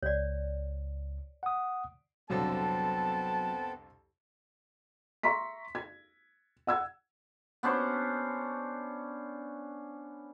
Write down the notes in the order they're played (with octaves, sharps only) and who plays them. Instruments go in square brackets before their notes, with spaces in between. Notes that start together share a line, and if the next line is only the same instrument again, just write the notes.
[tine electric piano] C#2 [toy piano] C#5 D5
[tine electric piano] F#5 D#6
[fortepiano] C2 F2 D3 [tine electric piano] F#3 [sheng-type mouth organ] B3 C4 A4 [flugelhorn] A5
[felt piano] E5 A#5 C6 C#6 B6
G#6
F#5 E6 G#6
[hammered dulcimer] B3 C#4 D4 C5